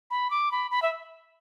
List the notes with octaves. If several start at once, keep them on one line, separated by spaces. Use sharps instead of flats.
B5
D6
B5
B5
E5